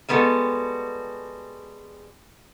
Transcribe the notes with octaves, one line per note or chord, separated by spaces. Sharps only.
G3 G#3 B3 F#4 A4